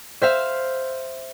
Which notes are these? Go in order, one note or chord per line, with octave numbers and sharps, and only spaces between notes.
C5 E5 F5